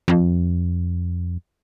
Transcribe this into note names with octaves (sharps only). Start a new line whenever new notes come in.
F2